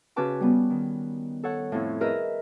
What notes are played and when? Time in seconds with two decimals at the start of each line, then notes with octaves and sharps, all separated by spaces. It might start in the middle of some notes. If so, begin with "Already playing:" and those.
0.16 C#3 C#4 F#4 B4 A5 D6
0.40 G3 B3
0.70 D#3
1.43 A4 C#5 F#5
1.72 F2 A2
2.01 G#4 A#4 B4 D#5 E5